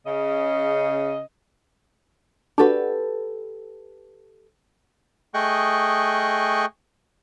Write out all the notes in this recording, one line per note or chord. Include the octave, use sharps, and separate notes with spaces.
C#3 D#5
D4 F#4 G4 A4 B4
A3 G#4 D#5 G5 C#6 F#6